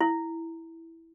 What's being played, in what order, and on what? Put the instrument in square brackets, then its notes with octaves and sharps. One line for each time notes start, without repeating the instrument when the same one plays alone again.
[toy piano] E4